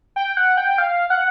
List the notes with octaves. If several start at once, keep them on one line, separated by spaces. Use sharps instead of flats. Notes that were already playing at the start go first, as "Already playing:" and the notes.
G5
F#5
G5
F5
F#5